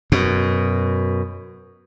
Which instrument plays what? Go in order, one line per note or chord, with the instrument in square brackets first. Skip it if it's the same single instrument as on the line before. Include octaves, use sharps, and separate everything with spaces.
[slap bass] F#2 B2